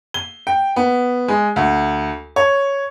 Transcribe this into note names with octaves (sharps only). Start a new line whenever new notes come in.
G7
G5
B3
G#3
D2
C#5